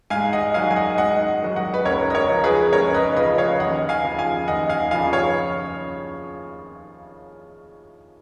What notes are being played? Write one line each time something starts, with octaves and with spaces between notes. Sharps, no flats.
G#2 F5 G#5
D#5 F#5
D#3 F#3 F5 G#5
G#5
D#5 F#5
G#2 D#5 F#5
D#3 F#3
D#5 F#5
B4
C#2 A#4 C#5
D#5
A#4 C#5
C#3 F3
G#4 B4
C#2 A#4 C#5
B4 D#5
C#3 F3 B4 D#5
C#5 F5
D#2 D#5 F#5
F5 G#5
C#3 F3
F5 G#5
D#2 D#5 F#5
F5 G#5
C#3 F3 F5 G#5
C#5 F5